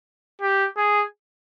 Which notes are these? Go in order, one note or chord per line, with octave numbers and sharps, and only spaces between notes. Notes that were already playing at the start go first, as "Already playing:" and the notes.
G4
G#4